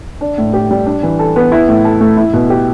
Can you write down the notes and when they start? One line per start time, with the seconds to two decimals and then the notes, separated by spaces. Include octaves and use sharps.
0.21 D4
0.38 A2
0.53 G4
0.71 G3
0.86 D4
1.03 E3
1.19 A4
1.36 B3
1.52 E4
1.68 A2
1.84 A4
2.01 A3
2.17 E4
2.33 B2
2.50 G4